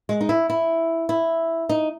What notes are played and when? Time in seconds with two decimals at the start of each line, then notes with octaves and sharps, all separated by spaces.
0.09 G#3
0.21 D#4
0.29 E4
0.50 E4
1.09 E4
1.69 D#4